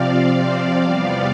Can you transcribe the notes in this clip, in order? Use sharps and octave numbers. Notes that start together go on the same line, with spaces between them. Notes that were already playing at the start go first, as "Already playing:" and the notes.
Already playing: C3 F3 C4 D5 F5
E2 C3 G3 B3